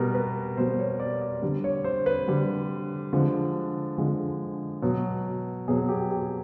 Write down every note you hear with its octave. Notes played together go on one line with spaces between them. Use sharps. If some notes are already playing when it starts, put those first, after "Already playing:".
Already playing: B2 G3 A#4
B4
B2 G3 C5
C#5
D5
D5
D3 G3
C#5
C5
B4
D3 G3
D3 F3 G#3
D3 F3 G#3
B2 F#3
B2 F#3 G#4
G4
G4